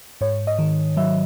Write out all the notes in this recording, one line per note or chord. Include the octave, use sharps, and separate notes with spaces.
G#2 C#5
D#5
D#3
F#3 E5